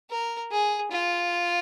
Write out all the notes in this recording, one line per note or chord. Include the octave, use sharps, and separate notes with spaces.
A#4
G#4
F4